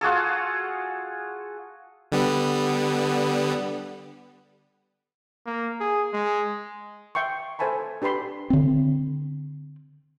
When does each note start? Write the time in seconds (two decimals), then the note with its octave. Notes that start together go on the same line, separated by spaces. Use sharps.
0.01 F4 F#4 G#4 A4
2.12 D3 G3 B3
5.46 A#3
5.80 G#4
6.13 G#3
7.15 E5 G5 C6 C#6
7.59 A4 C5 E5 G#5 A5 B5
8.02 D4 G4 B4 B5 C6
8.50 D3 C4